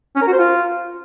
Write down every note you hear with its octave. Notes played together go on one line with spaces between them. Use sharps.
C#4
A#4
F#4
C5
F4